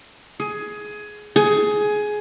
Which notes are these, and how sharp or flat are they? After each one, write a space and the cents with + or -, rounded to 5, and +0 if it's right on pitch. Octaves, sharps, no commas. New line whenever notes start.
G#4 +15
G#4 +15